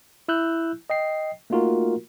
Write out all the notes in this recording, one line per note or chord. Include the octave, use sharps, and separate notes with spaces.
E4 E6 F#6 G6
D#5 G5 C7
A3 A#3 D#4 F4 F#4 A#4